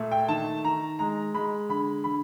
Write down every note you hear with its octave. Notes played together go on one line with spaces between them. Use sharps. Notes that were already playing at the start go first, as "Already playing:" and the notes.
Already playing: A#2 A3
G5
D#3 A5
D#3 A#5
G#3 A#5
G#3 B5
D3 B5
D3 B5